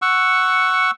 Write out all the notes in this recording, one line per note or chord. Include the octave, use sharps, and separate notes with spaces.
F#5 C#6 E6